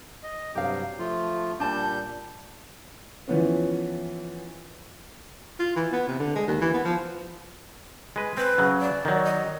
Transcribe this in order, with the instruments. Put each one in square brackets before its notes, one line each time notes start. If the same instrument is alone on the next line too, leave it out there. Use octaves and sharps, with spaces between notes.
[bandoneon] D#5
[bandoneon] G2 C3 F#3 [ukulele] G4 F5
[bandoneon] F3 A3 F4
[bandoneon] A#2 G3 G6 [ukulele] D4 A5
[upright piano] E3 F3 B3 C#4
[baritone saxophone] F4
E3
B3
C3
D3
G#3
D#2
E3
B3
F3
[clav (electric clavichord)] G#3 B4
[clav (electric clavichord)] C4 [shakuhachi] B4
[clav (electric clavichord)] C#3 F#3
[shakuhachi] D5
[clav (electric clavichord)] D#3 F#3
[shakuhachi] D#5